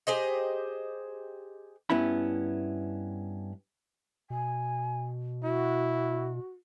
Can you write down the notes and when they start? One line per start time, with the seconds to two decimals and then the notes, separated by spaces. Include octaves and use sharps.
0.07 G4 G#4 C5 D#5
1.90 G2 B3 C#4 E4 B5
4.30 B2 G#5
5.44 E4 F#4